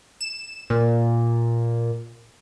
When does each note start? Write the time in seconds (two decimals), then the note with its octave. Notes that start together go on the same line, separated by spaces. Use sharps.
0.21 E7
0.70 A#2